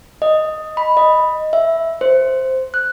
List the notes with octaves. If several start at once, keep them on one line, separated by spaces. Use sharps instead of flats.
D#5
B5
D#5
E5
C5
F#6